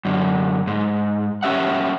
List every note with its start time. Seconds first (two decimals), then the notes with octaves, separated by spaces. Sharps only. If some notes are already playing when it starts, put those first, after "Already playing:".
0.05 F#2 D3
0.67 G#2
1.43 C#4 G4 E5 F#5